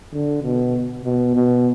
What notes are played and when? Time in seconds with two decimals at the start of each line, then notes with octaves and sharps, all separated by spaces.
0.13 D3
0.43 B2
1.05 B2
1.35 B2